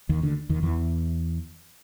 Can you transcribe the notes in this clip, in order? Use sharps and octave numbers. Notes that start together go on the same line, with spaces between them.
D#2 D#3
D2 D3
D#2 D#3
E2 E3